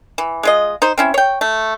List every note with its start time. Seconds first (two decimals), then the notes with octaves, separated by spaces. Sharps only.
0.18 E3
0.43 G#3 F4 D#5
0.82 D#4 C5
0.98 C4 C#4 E4
1.14 C#5 G5
1.41 A3